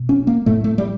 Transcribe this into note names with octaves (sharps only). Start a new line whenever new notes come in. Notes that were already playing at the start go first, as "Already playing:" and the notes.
Already playing: B2
C#4
A#3
A2 A3
A3
G3